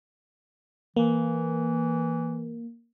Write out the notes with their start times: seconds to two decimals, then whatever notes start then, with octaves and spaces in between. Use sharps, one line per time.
0.96 E3 A#3